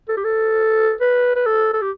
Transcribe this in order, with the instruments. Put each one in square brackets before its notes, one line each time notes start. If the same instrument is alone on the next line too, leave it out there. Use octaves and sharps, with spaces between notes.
[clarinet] A4
G4
A4
B4
B4
A4
A4
G4